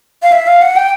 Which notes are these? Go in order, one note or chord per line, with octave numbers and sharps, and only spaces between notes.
F5
E5
F5
F#5
G5